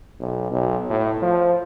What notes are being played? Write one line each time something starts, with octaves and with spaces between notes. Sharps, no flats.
B1
B1
A2
F3